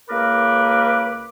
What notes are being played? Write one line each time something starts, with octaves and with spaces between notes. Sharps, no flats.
C#2 A#3 A#4 B4 D6